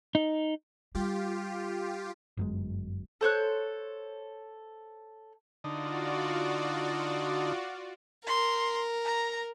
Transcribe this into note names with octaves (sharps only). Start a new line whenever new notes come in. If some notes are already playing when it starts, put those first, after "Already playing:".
D#4
G3 F4 G4
G1 F#2 G#3
A4 C5 C#5 F#6
D3 D#4 F4 F#4 D5
A#4 C6
A#5